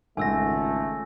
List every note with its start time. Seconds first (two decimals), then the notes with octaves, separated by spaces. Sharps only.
0.17 G#1 C#2 A3 G#5 E6 A#6